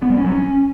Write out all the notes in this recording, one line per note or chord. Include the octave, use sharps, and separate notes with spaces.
B3
G3
C#4
F#3
C#4